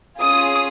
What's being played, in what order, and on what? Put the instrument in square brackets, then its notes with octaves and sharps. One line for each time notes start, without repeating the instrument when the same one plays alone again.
[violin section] C#4 F4 G#4 D#6